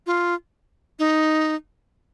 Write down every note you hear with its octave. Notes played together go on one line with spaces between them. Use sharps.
F4
D#4